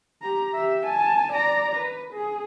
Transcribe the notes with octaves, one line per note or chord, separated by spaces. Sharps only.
G4 A#5
G4 E5
G#5 A5
D5 A#5
B4
G#4